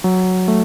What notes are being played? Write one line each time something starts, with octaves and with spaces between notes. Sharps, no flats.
F#3
A3